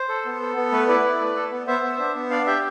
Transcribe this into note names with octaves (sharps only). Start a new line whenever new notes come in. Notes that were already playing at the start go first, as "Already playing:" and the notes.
Already playing: C5
A4
B3
A4
B3
A3 B4
E4 B4 D5
E4
A3
A4
B3
B3 C5 E5
B3
D4
B3
D4 D5 F5
G4 E5 G5